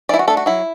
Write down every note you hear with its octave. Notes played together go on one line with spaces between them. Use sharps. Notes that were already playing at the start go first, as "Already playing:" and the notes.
E3 E4 D5
F#4
A3 D4 A4
F#4
F#3 E4